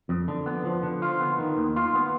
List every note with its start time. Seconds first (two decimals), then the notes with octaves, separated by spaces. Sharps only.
0.09 F2
0.28 D3
0.46 B3
0.65 F3
0.83 D3
1.02 F4
1.21 B3
1.38 D#3
1.57 D#2
1.76 F4
1.95 B3